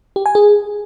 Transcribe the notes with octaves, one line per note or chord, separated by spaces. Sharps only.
G4
G#5
G#4